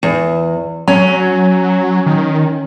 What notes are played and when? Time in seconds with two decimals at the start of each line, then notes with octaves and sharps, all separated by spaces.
0.03 E2
0.88 F#3 C#4
2.06 D#3